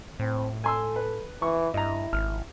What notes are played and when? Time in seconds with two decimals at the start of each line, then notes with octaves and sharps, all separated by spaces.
0.20 A2 C4
0.64 A4 G#5 C6 E6
0.96 B4
1.42 E3 C#6
1.74 G2 E4 D#5 A#5
2.13 G#1 F6